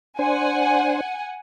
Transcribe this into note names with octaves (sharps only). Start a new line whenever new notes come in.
D4 C5 F#5 G#5